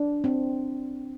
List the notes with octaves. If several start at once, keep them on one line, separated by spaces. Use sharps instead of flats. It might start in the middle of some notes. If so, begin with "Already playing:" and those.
Already playing: D4
C4